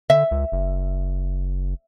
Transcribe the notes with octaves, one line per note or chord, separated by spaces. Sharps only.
D3 E5
C#2
F#1